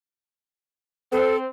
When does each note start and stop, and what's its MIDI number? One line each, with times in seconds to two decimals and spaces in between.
1.12 1.44 60
1.12 1.36 69